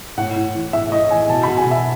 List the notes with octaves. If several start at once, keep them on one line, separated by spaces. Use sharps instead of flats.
A2 F#5
A2
E3
A2 E5
A2 D#5
E3 G#5
B2 A5
B2 B5
G#5
B2 E5